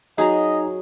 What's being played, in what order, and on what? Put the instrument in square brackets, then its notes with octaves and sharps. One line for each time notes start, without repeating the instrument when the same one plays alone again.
[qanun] F#3 G#4 [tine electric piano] D#4 G#5 A#5 [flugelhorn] D#5